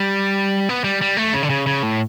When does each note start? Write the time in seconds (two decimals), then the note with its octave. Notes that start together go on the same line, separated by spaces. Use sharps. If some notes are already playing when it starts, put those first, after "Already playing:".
Already playing: G3
0.69 B3
0.84 G3
1.02 G3
1.17 A3
1.34 C#3
1.43 D3
1.50 C#3
1.67 C#3
1.83 A2